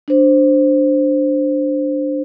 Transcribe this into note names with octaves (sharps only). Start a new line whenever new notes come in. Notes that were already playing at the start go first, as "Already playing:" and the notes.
D4 C5